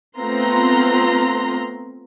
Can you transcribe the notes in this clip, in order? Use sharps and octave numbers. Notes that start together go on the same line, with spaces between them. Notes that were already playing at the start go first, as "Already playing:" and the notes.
A3 B3 C4 F4 A#5 C6